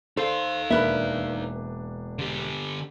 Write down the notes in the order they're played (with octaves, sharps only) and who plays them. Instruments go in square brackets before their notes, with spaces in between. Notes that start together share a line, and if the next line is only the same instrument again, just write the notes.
[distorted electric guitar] D#4 F5 [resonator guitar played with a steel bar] A4 C5
[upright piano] E1 D4 [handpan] A#3 [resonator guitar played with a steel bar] A#4 B4 E5
[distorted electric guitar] D3 G4